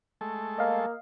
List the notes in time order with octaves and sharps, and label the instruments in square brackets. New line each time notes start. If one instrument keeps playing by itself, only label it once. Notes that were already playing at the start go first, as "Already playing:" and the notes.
[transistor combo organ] G#3 A3 A4
[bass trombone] A#3 [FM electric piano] D#5 F5